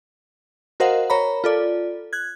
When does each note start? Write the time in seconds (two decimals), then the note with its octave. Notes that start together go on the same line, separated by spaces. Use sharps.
0.80 F#4 A#4 C5 D#5 F5 F#5
1.10 A#4 C#5 A#5 B5
1.44 F4 A4 D5
2.13 F#6 G#6